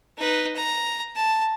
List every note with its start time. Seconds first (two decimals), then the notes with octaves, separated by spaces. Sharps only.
0.17 D#4 B4
0.56 A#5
1.15 A5